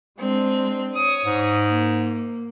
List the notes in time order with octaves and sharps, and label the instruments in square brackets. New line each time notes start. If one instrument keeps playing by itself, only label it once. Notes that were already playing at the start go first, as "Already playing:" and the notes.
[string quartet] G#3 C4 D4
C#5 D#6
[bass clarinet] G#2
[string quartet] A#3